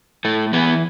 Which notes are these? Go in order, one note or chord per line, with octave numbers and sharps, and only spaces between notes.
A2 A3
E3 B3